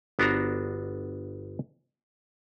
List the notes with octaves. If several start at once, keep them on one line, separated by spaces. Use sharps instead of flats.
G1 B3 D4 F#4 C5 A#5